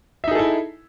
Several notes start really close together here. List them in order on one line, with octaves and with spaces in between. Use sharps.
E5 D#4 G#4 A4 E4